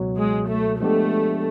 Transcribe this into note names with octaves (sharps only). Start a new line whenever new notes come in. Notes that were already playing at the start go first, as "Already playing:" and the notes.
Already playing: C#2 B2 F#3
G#3
A3
F3 G#3 A3 B3 D4 G4